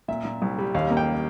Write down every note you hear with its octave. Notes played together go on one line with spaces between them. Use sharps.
A#2 E5
A#2
C2
G3
D#2 F5
A#3
G5